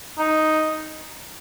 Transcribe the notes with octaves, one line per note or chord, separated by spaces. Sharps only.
D#4